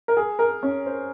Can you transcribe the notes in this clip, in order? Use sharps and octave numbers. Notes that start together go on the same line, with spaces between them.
A#4
G#4
A#4
C#4
C5